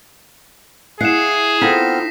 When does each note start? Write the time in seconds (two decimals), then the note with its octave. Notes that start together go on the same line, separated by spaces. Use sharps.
1.01 E4 G#4 F5 F#5 C7 E7
1.61 B3 C4 D#4 F4 A4 F6 A#6 B6